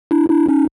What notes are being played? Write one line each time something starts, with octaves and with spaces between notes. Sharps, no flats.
D4 E4
D4 E4
C#4 D#4